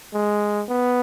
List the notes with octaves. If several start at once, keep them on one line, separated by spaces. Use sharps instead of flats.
G#3
B3